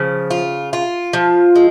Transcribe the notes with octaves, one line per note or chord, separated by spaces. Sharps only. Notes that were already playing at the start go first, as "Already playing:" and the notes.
Already playing: C#3 F3
F4
F4
F3
G#3